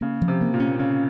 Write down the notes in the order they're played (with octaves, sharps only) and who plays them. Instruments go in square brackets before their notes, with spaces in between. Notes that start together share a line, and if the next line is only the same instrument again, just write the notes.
[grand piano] C#3 [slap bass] A#3
[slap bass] F3
[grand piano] C3
[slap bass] A#3
[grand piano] A#2
[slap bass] C#4
[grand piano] C#3 [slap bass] C#4